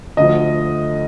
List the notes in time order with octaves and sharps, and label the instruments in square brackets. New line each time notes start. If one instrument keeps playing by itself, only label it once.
[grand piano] D2 D3 F3 D#5